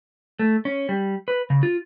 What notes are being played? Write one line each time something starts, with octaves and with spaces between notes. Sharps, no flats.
A3
C#4
G3
B4
C#3
F4